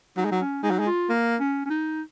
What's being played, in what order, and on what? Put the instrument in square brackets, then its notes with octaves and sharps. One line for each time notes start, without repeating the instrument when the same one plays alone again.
[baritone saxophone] F#3 [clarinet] D#4
[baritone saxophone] G#3
F#3
[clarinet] C#4
[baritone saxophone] G#3 [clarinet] D#4
[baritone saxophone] F#3
G#3
[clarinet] F4
[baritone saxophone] A#3
[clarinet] C#4
C#4
D#4